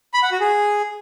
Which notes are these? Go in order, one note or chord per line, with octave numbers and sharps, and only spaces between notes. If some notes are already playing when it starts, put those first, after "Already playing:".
B5
F#5
F#4
G#4